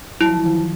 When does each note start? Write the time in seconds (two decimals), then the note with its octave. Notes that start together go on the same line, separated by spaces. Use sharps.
0.21 F#3 E4
0.29 F3
0.37 E3
0.45 D#3 F3